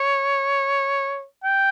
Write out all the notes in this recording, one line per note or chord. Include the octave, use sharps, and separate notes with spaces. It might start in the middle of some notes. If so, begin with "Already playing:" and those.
Already playing: C#5
G5